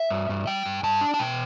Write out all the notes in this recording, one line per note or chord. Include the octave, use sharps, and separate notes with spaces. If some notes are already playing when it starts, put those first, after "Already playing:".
Already playing: E5
G2
G2
G3 G5
G2
G2 A5
D4
A5
B2 G5